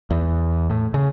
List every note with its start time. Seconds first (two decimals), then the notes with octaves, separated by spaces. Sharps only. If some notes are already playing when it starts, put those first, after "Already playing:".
0.10 E2
0.70 A2
0.94 C#3